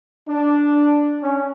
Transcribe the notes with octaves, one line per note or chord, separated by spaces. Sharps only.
D4
C#4